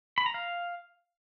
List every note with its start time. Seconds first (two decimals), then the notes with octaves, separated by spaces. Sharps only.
0.18 B5
0.26 A#5
0.34 F5